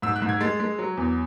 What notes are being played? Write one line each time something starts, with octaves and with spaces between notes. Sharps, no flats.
G#2 E6
F#6
G#2
G#6
G#3 A6
G#3
F#3
E2